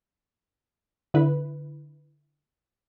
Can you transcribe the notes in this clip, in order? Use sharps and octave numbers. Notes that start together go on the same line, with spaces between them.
D3 E4 B4